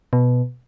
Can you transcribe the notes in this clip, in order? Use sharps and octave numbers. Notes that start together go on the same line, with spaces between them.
B2